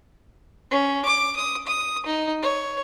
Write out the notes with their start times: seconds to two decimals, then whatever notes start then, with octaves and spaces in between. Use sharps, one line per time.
0.71 C#4
1.05 D6
1.36 D#6
1.67 D#6
2.06 D#4
2.42 C#5